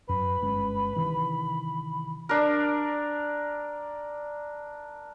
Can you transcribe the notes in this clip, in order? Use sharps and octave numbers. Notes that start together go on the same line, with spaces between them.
F#2 B4 B5
G1 G#3 C#4
C3 D#3 E3
D4 A#4